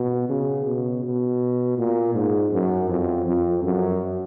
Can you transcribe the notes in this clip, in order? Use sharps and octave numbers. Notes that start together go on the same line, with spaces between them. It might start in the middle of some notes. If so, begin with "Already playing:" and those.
Already playing: B2
C#3
B2
B2
A#2
G#2
F#2
F2
F2
F#2